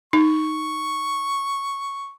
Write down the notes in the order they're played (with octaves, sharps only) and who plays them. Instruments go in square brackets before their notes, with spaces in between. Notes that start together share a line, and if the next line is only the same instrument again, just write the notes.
[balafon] D#4 [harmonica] C#6